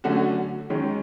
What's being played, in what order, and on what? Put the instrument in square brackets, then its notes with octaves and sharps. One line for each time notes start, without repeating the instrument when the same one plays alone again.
[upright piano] D3 F#3 A3 C#4 F#4
D#3 G#3 C#4